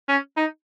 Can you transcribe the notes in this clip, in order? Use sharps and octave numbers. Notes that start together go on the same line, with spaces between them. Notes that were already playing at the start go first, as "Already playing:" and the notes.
C#4
D#4